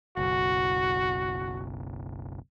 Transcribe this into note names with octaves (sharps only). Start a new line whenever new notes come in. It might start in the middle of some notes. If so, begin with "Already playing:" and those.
F#1 B1 F#4